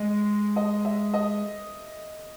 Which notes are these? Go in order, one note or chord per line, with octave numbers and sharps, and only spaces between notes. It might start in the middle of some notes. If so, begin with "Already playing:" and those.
Already playing: G#3 D#5
D#5
E5
D#5